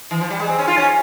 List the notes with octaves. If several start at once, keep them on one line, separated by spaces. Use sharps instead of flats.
E3
F3
G3
G#3
C4
C#4
F4
C#4